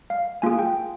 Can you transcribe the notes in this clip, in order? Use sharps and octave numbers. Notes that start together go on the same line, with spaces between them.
F5
A#3 F4 G#4 G#5
G5